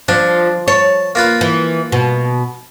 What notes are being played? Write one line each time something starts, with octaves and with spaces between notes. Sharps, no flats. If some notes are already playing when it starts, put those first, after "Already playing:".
F3 D4
C#5 A5
A#3 F4 B4
E3
B2